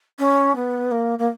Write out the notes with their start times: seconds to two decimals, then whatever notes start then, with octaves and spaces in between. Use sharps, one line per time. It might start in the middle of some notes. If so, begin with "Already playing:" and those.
0.19 C#4
0.55 B3
0.91 A#3
1.19 A#3